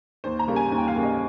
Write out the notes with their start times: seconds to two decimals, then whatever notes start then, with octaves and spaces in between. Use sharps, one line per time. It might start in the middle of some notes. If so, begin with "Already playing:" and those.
0.24 D#2 C5
0.39 A#5
0.47 C#3 G3 A#3
0.56 G#5
0.72 D#2
0.78 G5
0.88 F5
0.96 C#3 G3 A#3
1.03 D#5